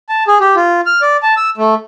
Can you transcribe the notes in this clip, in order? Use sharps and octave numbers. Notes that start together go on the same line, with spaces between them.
A5
G#4
G4
F4
F6
D5
A5
E6
A3